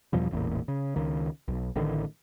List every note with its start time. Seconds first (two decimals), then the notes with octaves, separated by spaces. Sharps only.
0.13 E2 B2 F3 G3
0.31 E1 A1 E2 A#2
0.68 C#3
0.96 C#2 D#3
1.48 B1
1.76 A1 A2 D3 D#3